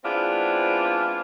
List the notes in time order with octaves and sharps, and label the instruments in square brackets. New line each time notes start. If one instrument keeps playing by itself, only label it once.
[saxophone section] G#3 B3 C4 D4 E4 F4